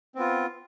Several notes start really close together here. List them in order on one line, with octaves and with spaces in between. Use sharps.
C4 B3 F4